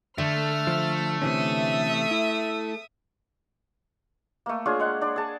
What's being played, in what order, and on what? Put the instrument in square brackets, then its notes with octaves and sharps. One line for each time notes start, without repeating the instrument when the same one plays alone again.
[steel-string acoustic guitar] D3 [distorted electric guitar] A3 [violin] F6
[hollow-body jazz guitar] F3
[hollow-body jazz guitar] C3 E3 C#4 [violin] E5 D#6
[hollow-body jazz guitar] E4
[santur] A3 A#3
D4 F4 G#4 C#5
G#3 F#5
D4 D5
G#4 A5